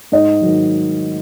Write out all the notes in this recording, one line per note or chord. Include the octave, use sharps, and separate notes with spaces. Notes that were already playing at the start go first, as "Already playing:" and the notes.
G#2 D#5
D#3 F#3